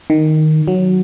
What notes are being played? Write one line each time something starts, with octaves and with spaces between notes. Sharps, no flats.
D#3
F#3